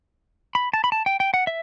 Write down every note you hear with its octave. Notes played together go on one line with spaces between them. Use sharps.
B5
A5
B5
A5
G5
G5
F#5
E5